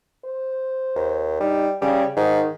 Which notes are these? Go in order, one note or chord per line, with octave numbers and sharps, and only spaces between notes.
C5
D#2
G3 D#4
C#3 G3
G#2 D#3